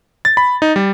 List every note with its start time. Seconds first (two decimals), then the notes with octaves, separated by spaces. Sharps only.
0.25 A6
0.37 B5
0.62 D#4
0.76 G3